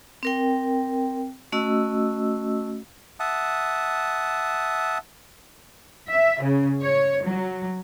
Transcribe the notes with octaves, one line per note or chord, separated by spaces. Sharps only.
C4 A#4 G5
A3 C#4 F#4 D#5 E6
E5 F#5 A5 D#6
E5
C#3
C#5
F#3